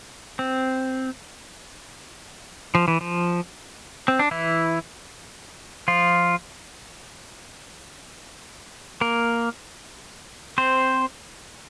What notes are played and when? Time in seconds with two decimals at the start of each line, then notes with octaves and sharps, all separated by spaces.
0.39 C4
2.75 F3
2.88 E3
3.01 F3
4.08 C4
4.19 D4
4.31 E3 E4
5.88 F3 F4
9.01 A#3 A#4
10.58 C4 C5